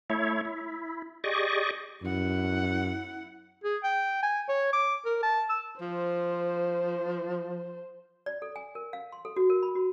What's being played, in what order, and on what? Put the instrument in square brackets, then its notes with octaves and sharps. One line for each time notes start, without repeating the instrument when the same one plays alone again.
[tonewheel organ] A3 E4 C#5
E4
G4 G#4 D5 D#5 C#6
[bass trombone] F#2 [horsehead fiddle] E4 F#5
[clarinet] G#4
G5
G#5
C#5
D6
A#4
A5
E6
[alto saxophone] F3 [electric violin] C5
[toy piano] D5
A4
G#5
A#4
F5
C6
A4
F#4
A#4
B5
F#4